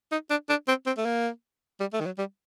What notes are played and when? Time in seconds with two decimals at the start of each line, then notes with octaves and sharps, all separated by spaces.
0.12 D#4
0.30 D4
0.50 D4
0.68 C4
0.86 C4
0.98 A3
1.06 A#3
1.80 G3
1.93 A3
2.00 D#3
2.06 F#3
2.18 G3